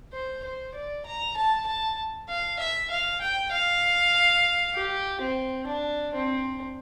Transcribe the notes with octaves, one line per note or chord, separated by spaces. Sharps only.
C5
C5
D5
A#5
A5
A5
F5
E5
F5
G5
F5
G4
C4
D4
C4